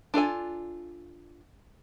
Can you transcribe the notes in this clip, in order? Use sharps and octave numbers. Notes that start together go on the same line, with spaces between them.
D4 F4 A4 G#5